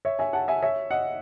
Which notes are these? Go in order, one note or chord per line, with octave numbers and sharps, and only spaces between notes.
C#5 E5
E5 G#5
F#5 A5
E5 G#5
C#5 E5
D#5 F#5